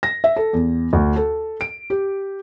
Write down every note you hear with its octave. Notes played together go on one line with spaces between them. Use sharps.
A#6
E5
A4
E2
D2
A4
D7
G4